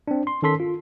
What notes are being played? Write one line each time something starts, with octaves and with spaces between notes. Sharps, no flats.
C4 D4
C6
D#3 C#4 A4 C6 B6
F4